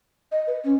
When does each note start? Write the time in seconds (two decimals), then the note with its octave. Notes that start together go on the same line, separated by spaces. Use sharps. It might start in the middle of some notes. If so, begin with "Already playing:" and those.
0.32 D#5
0.47 B4
0.64 C#4